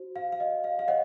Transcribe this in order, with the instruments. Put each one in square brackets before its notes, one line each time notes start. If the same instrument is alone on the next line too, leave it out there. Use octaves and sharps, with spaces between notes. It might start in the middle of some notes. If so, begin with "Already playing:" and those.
Already playing: [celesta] F#4 C5
F5
F5
D#5
F5
F5
C#5 D#5 F#5